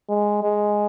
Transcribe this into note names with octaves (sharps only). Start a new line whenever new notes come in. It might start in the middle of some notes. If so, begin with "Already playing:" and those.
G#3
G#3